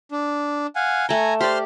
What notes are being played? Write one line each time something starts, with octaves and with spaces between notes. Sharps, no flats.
D4
F5 F#5 G#5
A3 G5 G#5 A#5
G4 C5 D5 C6 F6